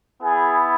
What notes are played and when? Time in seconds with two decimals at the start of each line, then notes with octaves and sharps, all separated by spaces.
0.23 B3 E4 G#4